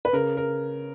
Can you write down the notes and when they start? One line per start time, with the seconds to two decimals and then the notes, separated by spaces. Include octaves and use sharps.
0.05 B4
0.13 C#3 A#4
0.37 A#4